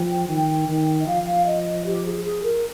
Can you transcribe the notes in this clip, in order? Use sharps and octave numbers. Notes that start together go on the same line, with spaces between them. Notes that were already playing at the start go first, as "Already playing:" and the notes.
Already playing: F3 G5
D#3
D#3
D#5
F3 F5
D#5
G4
G#4
G#4
A#4